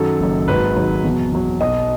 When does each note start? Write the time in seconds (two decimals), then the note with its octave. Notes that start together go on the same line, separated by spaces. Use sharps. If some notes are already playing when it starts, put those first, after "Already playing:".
Already playing: F#2 D#3 F#3 A4
0.20 F#1 F#2 D#3 F#3
0.47 G#1 G#2 D#3 F#3 B4
0.76 G#1 G#2 D#3 F#3
1.04 E2 B2 F#3
1.32 E2 B2 F#3
1.61 B1 B2 F#3 D#5